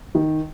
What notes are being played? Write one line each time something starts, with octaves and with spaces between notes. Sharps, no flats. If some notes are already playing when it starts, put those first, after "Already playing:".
D#3